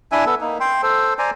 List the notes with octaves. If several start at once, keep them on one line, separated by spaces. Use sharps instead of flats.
D4 E4 E5 G#5
B3 A4
A#3 D#4
G5 C6
A4 C5
C5 D5 G#5 A#5